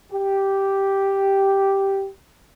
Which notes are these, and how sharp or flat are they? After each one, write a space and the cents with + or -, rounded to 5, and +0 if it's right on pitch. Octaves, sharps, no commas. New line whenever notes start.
G4 -5